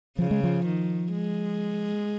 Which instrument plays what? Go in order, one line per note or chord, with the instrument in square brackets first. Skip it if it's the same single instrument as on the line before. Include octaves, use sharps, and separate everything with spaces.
[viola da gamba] C#3 [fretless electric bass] F3
[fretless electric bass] G#3
F3
[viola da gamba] D#3
G#3